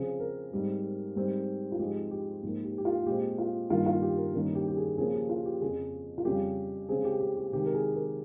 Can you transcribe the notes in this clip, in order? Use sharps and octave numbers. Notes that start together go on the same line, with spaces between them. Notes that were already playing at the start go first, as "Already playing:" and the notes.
Already playing: C#3 F3 C4 G#4
A#4
G#2 G3 C4
G#2 G3 C4
F4
G#2 F3 G#3 C4 G4
G4
G#2 F3 A#3
G4
G4
F4
A#2 G#3 C4 G4
F4
G2 D#3 A#3 F4
F4
G4
A#4
G2 D#3 A#3 C#4 A#4
G4
G4
G#4
C#3 F3 A#3 C#4 G#4
G4
F4
G4
F2 C#3 F3 G#4
F4
F2 C#3 G3 G4
C#3 G#3 C4 G#4
G4
G4
G4
C3 D#3 G#3 G4
A#4
G#4
A#4